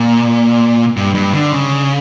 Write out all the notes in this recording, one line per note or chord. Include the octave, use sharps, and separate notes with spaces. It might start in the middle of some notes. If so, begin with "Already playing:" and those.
Already playing: A#2
G2
G2
D3
C#3